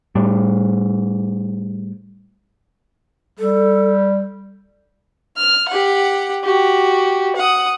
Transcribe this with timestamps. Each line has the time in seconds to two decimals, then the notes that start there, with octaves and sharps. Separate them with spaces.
0.15 A2 G3
3.39 G3 A4
5.37 F6
5.68 G4 F#5
6.44 F#4 G4
7.36 F#5 D#6